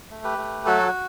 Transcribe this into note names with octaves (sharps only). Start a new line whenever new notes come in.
A3
G4 B4
A3
F#3 F#4 A4
F#4